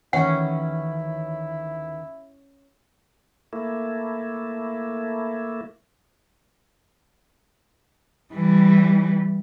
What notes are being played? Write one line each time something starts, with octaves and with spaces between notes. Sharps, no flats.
D2 D#3 E3 C#4 E4 F#5
A3 A#3 E4
E3 G3